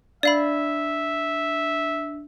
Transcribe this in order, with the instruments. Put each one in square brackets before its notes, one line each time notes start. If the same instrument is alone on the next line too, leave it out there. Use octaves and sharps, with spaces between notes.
[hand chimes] D4 [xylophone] D5 F5 B5 [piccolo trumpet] E5